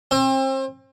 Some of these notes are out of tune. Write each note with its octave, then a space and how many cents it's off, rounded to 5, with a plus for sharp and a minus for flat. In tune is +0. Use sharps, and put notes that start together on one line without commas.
C4 +35